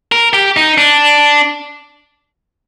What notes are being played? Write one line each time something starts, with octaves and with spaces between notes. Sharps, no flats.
A#4
G4
D#4
D4